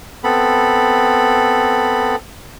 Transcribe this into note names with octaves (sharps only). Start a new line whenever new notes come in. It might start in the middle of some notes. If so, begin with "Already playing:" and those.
B3 C4 A4 B5